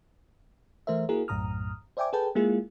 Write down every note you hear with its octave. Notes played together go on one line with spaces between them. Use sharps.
E3 A3 A#4 C5 E5
A#3 E4 F#4 G#4 A#4
B1 F#2 A2 A#5 D#6 F6
C5 D5 E5 G5 G#5 D6
G#4 A4 B4 G5 A5
G#3 A#3 E4 F4 G#4